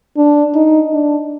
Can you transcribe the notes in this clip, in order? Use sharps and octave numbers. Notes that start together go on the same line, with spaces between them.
D4
D#4
D4